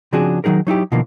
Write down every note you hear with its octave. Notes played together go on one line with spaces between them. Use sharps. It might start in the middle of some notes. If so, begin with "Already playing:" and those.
C#3 F3 C4 D4 F#4 G#4
D#3 F#3 D#4 G#4 A#4
F#3 D#4 E4 G4
B2 D3 E3 F3 A#3